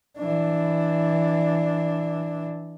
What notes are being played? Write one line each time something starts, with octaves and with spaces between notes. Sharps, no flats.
E3 D4